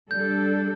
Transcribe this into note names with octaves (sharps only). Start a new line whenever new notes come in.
G3 D4 A4 G6